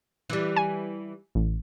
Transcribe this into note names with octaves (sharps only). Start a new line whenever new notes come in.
E3 G3
G#5
A1